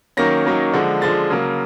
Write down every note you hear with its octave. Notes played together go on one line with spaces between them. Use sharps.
D#3 F#3 A#3 C#4 A#6
D#3 F#3 A#3 C#4
D3 F3 G#3
D3 F3 G#3 A6
C#3 F#3 A#3